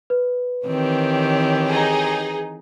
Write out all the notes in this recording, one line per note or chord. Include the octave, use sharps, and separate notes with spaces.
B4
D#3 E3 C4 G4 C#5
D#4 G#4